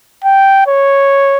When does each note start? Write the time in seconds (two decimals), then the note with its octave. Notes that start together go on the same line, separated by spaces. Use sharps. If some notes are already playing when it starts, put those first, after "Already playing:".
0.24 G5
0.67 C#5